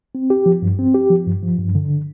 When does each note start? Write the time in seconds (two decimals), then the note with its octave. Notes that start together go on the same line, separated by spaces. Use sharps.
0.15 C4
0.30 G4
0.46 F3
0.62 G2
0.79 C4
0.94 G4
1.10 F3
1.26 G2
1.43 F3
1.58 G2
1.75 D3